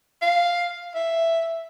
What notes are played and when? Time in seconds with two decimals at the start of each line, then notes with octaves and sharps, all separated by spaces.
0.22 F5
0.95 E5